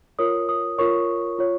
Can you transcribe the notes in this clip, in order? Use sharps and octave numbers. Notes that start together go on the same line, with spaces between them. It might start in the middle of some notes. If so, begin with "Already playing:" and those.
F4 A#4 C#5 D#6
D#6
F4 A#4 C#5 C#6
F4 C#5